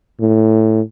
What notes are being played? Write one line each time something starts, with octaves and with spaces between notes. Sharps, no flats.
A2